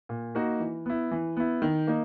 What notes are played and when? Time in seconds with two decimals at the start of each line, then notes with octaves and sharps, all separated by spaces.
0.09 A#2
0.35 A#3 D#4 F#4
0.60 E3
0.86 B3 E4
1.11 E3
1.37 B3 E4
1.62 D#3
1.87 A#3 D#4